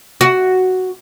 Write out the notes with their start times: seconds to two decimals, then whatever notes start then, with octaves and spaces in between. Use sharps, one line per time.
0.21 F#4